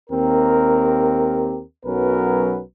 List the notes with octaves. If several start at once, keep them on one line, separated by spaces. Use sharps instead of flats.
D#2 C4 G4 A#4
B1 F#3 B3 C#4 A#4 B4